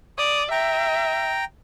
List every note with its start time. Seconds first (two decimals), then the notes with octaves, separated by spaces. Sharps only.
0.18 D5 D#6
0.51 E5 G5 A#5